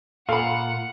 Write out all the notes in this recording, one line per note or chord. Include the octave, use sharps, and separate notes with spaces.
A#2 A4 F5 F#5 B5